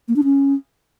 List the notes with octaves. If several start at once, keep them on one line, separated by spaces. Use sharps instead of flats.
A#3
D4
C#4